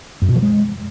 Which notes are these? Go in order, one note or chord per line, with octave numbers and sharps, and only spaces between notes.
F#2
B2
F3
G#3